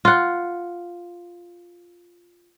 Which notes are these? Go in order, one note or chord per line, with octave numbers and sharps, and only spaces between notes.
F4 F#5